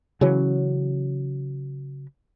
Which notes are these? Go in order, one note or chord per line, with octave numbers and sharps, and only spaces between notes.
C#3 E3 F#3 C#4